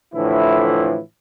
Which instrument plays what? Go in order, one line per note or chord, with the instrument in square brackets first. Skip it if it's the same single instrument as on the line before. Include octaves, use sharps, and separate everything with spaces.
[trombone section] A2 D3 E3 F3 E4